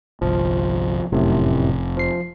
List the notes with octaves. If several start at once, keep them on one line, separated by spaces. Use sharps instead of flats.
G1 C2 F3
F1 F#2 A2 C3
F3 C7